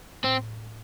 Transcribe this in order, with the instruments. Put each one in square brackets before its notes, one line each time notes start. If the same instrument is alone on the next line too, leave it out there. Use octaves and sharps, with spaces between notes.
[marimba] A2 [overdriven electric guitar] C4